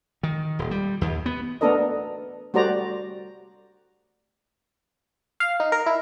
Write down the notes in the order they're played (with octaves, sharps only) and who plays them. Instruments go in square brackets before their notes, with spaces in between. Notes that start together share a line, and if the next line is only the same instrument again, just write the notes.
[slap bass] D#3
D#1
G3
D#2
B3
[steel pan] A3 B3 D4 A4 A#4 D#5
G3 A3 F#4 C5 D5 A#5
[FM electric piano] F5
D#4
A#4
E4